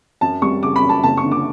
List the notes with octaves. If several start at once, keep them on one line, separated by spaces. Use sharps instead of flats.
F#2 A5
G3 C#6
C#3 D6
B5
F#2
A5
F#1 A5
C#6
D3
D6